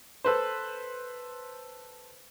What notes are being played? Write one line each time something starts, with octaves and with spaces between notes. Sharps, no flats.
A4 B4 C5